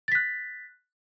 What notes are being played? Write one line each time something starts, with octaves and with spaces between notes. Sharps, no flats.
F#6 A6 B6